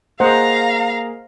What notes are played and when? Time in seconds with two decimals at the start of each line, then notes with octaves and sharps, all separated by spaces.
0.20 A#3 G#4 C5 D#5 F5 F#5 A#5